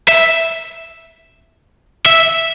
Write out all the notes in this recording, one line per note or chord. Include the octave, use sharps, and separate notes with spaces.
E5
E5